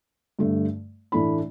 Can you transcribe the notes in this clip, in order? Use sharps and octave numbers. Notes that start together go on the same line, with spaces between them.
G2 D3 A3
A2 E3 A3 D4 B5